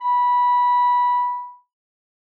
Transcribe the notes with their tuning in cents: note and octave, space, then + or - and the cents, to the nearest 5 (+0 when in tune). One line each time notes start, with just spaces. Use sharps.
B5 -15